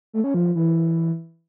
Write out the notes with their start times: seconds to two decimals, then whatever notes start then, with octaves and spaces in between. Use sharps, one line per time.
0.13 A3
0.24 C#4
0.34 F3
0.45 F3
0.55 E3